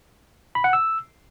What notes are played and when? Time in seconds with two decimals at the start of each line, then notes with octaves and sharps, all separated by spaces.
0.55 B5
0.64 F#5
0.73 E6